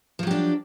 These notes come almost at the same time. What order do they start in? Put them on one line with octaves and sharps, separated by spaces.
F3 F#3 G4 D4